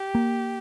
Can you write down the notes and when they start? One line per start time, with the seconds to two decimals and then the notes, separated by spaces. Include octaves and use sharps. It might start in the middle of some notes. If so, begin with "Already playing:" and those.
Already playing: G4
0.15 A#3